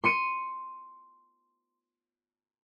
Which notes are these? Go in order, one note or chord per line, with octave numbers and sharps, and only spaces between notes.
C6 C#7 D#7